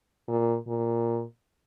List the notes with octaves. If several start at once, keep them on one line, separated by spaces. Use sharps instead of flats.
A#2
A#2